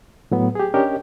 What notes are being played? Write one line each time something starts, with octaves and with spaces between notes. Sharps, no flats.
A2 F#3 B3
G4 G#4
C#4 D4 G4 A#4 C#5 D#5